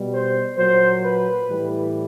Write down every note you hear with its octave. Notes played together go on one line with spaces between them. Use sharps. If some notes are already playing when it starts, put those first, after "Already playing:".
Already playing: B2 G3
C5
A#2 F#3 C5
B4
A2 E3 G3